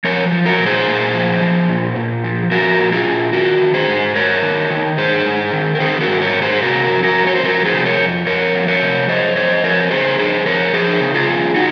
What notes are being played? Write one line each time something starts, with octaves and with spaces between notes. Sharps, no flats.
F3 A#4 C#5
F3
F#4 A#4
A#2
G#4 C5
A#2
F3
F3
A#2
A#2
F3
F3 F#4 A#4
A#2
F4 G#4
A#2
D#3 F#4 A#4
D#3
G#4 C5
G#2
G#2 A#4 C#5
D#3
D#3
G#2 G#4 C5
G#2
D#3
A#4
D#3 G#4 C5
F#4 A#4
G#2
A#4 C#5
G#2
G#4 C5
C3 F#4 A#4
F2
F#4 A#4
F2
C#5
C5
F3 F#4 A#4
G#4 C5
C3
A#4 C#5
F2
F2 A#4 C#5
F3
A#4 C#5
C3
F2 C5 D#5
F2 C5 D#5
F3 A#4 C#5
C#3 G#4 C5
F2 G#4 C5
F2 A#4 C#5
F3 G#4 C5
C#3
F4 G#4
F2
D#4 F#4